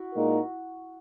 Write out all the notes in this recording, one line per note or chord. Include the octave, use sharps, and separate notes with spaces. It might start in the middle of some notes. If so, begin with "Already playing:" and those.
Already playing: E4 F#4
A#2 G#3 D#4 A#4